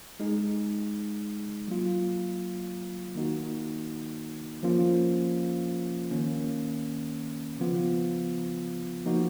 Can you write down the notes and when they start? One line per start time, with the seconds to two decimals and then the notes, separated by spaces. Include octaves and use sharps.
0.20 G#3 D#4 G#4
1.68 F#3 A#3 F4
3.15 D#3 A#3 D#4 F#4
4.63 F3 A#3 C#4 F4
6.11 D#3 A#3 C#4
7.58 C#3 F3 B3 F4
9.06 F3 A#3 D#4 F#4